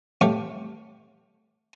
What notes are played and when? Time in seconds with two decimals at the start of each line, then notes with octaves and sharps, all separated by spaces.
0.21 A3 G4 C#5 F5 C#6